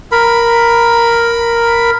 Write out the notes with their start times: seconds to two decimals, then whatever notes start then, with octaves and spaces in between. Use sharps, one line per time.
0.12 A#4 B5